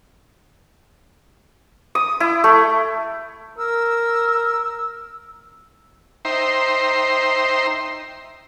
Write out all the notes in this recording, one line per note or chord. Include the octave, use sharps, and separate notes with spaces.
D#6
E4
A3
A#4 E6
D#4 C5 E5 G5 A#5 C6